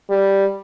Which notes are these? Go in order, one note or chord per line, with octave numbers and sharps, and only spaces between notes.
G3